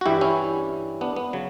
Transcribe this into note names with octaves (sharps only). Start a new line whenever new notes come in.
F#4
G2 E3 G3 E4 G4
C#4 E4
B3 D4
B3
C#3 F#3